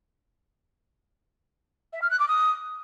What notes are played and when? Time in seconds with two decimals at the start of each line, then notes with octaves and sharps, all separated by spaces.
1.93 E5
2.02 F6
2.11 F#6
2.19 D6
2.28 D#6